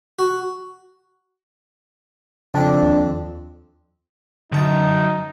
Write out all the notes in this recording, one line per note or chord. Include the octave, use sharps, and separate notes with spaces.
F#4
F2 C#3 C4 D4
D#2
C2 F#2 D3 D#4 A5 A6